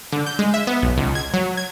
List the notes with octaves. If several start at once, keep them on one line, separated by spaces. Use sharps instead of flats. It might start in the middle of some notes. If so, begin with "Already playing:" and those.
D3
G6
G#3
E5
B3
B1
C#2
G#6
F#3
G#6